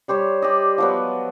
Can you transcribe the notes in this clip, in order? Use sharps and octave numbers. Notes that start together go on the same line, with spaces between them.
G3 G4 C5 C#5
G4 D5 D#5
F3 F#3 B3